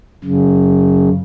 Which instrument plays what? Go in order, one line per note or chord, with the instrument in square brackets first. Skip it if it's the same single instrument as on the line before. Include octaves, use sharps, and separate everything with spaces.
[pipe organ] F#2 C#3